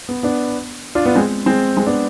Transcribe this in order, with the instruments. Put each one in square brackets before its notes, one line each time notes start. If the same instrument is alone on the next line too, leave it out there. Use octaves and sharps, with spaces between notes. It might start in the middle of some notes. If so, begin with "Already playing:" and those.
[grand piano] B3
B3 D4
D4 F4
B3 D4
G#3 C4
G#3 C4
G#3 C4
B3 D4